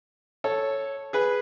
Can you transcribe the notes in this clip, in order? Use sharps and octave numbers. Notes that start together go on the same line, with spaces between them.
A4 C#5
G#4 B4